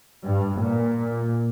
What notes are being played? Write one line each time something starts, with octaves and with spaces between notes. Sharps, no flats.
G2
A#2